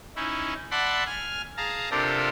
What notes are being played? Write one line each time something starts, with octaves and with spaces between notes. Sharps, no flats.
C#4 D#4 E4
D5 E5 F#5 A5 B5 C6
G#5 F6
G#4 F5 A5 A#5
C3 D4 F4 G4 A4 A#4